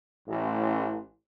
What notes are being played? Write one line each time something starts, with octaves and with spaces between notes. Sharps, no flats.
A1